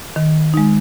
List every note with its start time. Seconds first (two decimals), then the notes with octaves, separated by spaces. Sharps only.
0.16 D#3
0.54 G#3 D#4